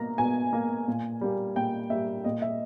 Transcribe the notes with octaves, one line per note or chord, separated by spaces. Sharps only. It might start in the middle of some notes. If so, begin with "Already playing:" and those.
Already playing: B2 A#3 A#5
B2 G#5
A#3
A#2
G3 A#3
A#2 G5
G3 A#3 E5
A#2 D#5
E5